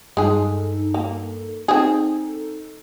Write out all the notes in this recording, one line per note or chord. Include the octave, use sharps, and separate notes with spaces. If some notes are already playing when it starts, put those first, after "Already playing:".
G2 G#3 D#4 G#4 A4
A#3
C4 D#4 G#4 A4